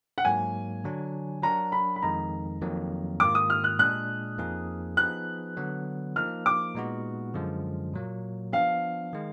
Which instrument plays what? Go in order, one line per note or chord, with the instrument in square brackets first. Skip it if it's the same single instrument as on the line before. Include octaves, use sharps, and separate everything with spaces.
[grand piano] F#5
[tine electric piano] G#2 F#3 A#3 [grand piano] G#5
[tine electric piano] D3 F#3 D4
[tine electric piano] F#3 D4 F#4 A#4 [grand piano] A#5
[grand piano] B5
B5
[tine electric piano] F2 D#3 G#3 D#4 [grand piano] A#5
[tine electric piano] F2 D#3 F#3 A#3
[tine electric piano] G#2 D#3 A#3 F4 [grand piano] D6
[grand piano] D#6
F6
F#6
[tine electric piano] A#2 G#3 D4 G#4 [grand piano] F#6
[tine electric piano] F2 F3 A#3 D#4 G#4
[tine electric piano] F3 B3 D#4 G#4 B4 [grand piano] F#6
[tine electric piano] D3 F#3 B3
[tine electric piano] F3 A#3 D#4 [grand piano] F6
[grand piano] D6
[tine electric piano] A#2 G#3 B3 D#4 F#4
F#2 D3 F3 G#3
A#2 F#3 A#3
[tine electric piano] F3 B3 D4 [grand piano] F5
[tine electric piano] D#3 G#3